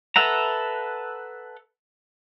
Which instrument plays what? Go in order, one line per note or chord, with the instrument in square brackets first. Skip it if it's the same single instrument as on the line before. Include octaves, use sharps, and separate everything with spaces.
[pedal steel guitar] A4 B4 E5 F#5 A#5